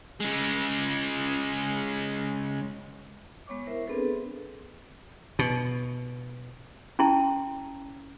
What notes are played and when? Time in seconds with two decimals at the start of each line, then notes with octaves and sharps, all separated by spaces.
0.20 C#3 G#3
3.47 G#3 B3 C#5 C#6 D6
3.67 E4 A#4 C5 E5
3.87 B3 C4 D4 G#4 A4 B4
5.39 B2
6.99 C#4 E4 A5